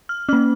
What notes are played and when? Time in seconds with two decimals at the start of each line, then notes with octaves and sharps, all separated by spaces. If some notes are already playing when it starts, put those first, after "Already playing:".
0.09 F6
0.29 A#3 C#4 F6